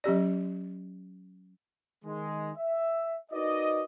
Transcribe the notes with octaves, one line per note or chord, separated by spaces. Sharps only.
F#3 C#4 G4 D5
D#3 G#3
E5
D#4 F#4 A#4 B4 D5 D#5